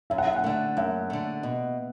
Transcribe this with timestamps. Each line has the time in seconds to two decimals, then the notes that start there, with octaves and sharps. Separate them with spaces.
0.10 F#2 E5
0.18 F#5
0.27 E5
0.36 F#5
0.44 D3 A3 E5
0.77 F#2 E5
1.10 D3 A3
1.43 B2